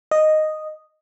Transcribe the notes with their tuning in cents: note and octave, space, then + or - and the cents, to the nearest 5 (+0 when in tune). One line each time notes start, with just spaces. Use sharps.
D#5 -5